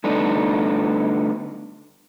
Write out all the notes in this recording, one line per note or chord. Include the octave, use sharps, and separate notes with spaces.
D3 G3 A3 B3 D4 D#4